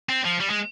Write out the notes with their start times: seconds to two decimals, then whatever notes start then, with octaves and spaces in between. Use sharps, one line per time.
0.09 C4
0.25 F3
0.40 G3
0.51 G#3